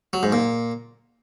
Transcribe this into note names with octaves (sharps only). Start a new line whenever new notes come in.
F#3
G#2
A#2